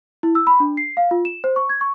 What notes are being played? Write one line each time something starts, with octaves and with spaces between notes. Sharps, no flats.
E4
E6
B5
D4
C7
F5
F4
E7
C5
C#6
G#6
C#6